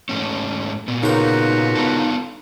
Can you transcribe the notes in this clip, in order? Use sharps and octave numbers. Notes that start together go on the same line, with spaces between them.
G#2 A3 C#4
A#2 B3
C#3 D#4 F4 F#4 A#4 B4
B3 D4 A4